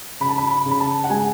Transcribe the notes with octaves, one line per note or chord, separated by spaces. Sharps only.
C#3 B5
A5
B5
B5
C#3
B5
A5
F#5
G#3 G#5